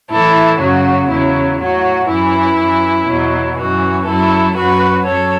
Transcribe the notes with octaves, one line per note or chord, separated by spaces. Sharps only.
A2 E3 E4 A4
F#2 C#3 F#3 F#4
E2 C#3 F#3 E4
A2 F#3 F#4
F#2 E3 E4
F#2 E3
E2 B2 F#3
F#2 E3 F#4
F#2 F#3 E4 A4
F#2 F#3 F#4 B4
F#2 F#3 A4 C#5